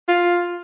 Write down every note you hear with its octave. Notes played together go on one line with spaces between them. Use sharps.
F4